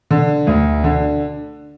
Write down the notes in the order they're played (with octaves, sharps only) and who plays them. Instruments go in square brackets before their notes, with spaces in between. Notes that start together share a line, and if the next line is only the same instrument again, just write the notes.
[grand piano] D3
D2
D3